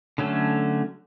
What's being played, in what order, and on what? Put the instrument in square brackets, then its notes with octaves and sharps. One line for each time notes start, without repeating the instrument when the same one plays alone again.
[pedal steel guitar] D3 F#3 A3 C#4